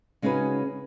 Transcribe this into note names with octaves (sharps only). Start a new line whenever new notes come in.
C#3 G#3 C#4 D#4 F#4 B4